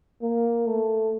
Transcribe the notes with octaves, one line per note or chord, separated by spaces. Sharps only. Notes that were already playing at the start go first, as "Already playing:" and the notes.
A#3
A3